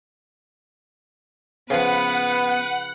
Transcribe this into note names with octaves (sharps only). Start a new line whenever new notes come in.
C#3 F3 B3 B4 F#5